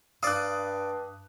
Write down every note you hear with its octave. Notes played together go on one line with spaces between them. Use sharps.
G2 D5 F5 D#6 F#6